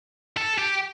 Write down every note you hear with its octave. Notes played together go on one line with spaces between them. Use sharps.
A4
G4